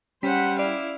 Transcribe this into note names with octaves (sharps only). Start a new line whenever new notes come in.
G3 C#4 C5 F#5 B6
E4 D5 F5